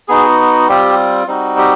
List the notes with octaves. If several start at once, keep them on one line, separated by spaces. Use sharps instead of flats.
B3 D#4 F#4 G#4
G3 C4 F4 G4
G3 C4 D#4 F#4
G4